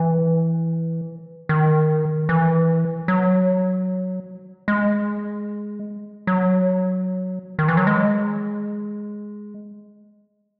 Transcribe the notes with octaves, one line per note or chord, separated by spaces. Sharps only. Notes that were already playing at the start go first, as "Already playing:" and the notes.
Already playing: E3
D#3
E3
F#3
G#3
F#3
D#3
E3
F#3
G#3